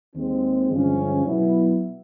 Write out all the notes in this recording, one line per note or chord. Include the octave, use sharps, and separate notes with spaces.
D#2 D#3 G#3 C4
G2 D3 F3 G#3 C#4
B2 F#3 B3 E4